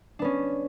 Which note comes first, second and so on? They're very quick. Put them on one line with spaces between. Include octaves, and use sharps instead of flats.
D4 B3 C#4